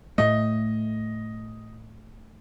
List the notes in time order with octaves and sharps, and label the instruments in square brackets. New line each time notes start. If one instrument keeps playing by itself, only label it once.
[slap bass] A2 A3 [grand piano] D#5